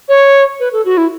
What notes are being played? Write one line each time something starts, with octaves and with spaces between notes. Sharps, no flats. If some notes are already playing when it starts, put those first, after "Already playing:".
C#5
B4
A4
F#4
E4